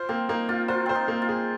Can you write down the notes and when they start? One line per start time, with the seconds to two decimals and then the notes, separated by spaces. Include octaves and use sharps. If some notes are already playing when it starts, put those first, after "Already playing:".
Already playing: F4 C5
0.09 A#3 C4
0.29 A#3 D#4
0.49 A#3 F4
0.68 F4 C5
0.86 C4 C5
0.95 D#4
1.08 A#3
1.22 F4
1.29 G#4